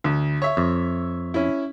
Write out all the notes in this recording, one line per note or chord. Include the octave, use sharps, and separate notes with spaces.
D2
C#5 E5
F2
C#4 E4